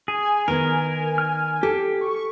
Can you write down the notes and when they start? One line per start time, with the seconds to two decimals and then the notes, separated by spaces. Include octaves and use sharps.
0.08 G#4 G#5
0.48 D#3 B3 A#4
1.18 F6
1.63 G4 A4
2.01 C#6